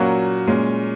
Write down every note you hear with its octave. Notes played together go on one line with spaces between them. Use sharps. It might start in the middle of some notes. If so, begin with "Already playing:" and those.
Already playing: A#2 F#3 A#3 C#4 F#4
A#2 G#3 C#4